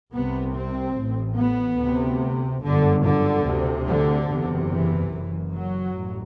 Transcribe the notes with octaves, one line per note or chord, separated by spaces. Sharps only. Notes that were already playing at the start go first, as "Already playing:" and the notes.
C2 C3 B3
C4
A1 A2
B3
D2 C3
G1 F#2 D3
D3
D2 C3
D3
F#1 E2 C3
E3
F#1 F#2
F#3
A1